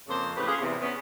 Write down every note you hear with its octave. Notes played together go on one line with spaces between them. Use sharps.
F2 C#3 A#3 A4 C5
A2 C#3 G4 B4
C#4 F4 G#4
E2 C3
B3 C#4